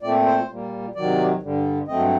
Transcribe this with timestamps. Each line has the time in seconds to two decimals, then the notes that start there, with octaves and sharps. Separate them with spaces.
0.02 A#2 A3 C4 D5
0.26 C5
0.49 A#2 G3 A#3
0.95 C3 D#3 F#3 D5
1.42 G2 D3 G3
1.88 G2 F#3 A3 C4 D#5